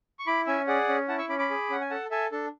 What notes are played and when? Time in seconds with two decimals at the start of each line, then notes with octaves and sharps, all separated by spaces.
0.19 C#6
0.27 E4 B5 D6
0.46 C#4 E5 G#5
0.67 G#4 D5 F#5
0.89 C#4
1.08 E4 F#5 A5
1.18 C#6 E6
1.29 C#4 B5 D6
1.39 B5 D6
1.50 G#4
1.70 C#4 F#5
1.81 G#5
1.90 A4 F#5 A5
2.11 A4 E5 G#5
2.32 D4 A4